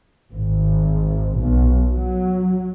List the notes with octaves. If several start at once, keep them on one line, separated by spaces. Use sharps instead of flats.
G#1
B1
F#3